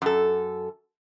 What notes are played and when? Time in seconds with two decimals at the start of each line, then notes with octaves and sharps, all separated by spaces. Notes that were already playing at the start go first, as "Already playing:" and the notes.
0.02 F#2 A4